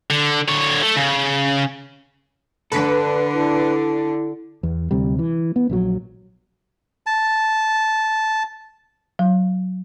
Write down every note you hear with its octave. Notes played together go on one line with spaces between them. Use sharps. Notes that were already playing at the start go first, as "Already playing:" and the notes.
D3
D3 C#5
A3
C#3
D3 D4 A4 B4
E4
E2
D2 C3 G3
E3
B3
A#1 C#3 F#3
A5
F#3